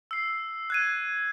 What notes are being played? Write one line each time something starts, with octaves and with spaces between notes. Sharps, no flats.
E6 C7
F#6 G#6 D#7